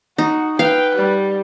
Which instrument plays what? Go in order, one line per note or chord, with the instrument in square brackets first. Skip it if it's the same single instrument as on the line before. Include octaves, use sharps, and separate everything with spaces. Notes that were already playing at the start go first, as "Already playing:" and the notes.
[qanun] D#4 [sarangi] F#4
[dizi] B4 [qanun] F5 [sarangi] G5
[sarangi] G3